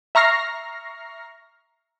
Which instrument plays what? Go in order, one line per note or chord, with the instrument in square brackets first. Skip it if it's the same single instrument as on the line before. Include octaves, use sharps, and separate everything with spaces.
[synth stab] E5 A#5 C#6 F6 A#6 C7